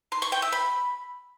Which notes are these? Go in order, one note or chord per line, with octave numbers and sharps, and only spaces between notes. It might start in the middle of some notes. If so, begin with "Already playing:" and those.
C6
C#6
G5
E5
B5